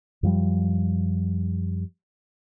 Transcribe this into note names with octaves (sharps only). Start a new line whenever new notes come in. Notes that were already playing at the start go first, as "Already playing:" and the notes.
F#2 F3 G3